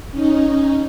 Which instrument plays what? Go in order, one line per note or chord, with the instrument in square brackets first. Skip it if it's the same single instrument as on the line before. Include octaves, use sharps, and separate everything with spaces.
[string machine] C#4 D#4